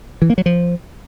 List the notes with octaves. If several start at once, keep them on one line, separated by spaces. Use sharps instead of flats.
E3
A#3
F#3
F3